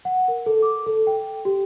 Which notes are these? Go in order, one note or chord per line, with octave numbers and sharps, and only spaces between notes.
F#5
A#4
A4
D6
A4
G5
G4